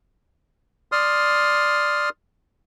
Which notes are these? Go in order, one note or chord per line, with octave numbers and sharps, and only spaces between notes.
D5 C6 D#6 F6